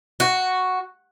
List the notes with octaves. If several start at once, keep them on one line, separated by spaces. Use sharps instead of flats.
F#4